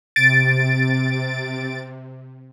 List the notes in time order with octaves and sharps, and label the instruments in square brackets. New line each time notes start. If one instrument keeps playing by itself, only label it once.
[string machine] C3 [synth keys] A6 D7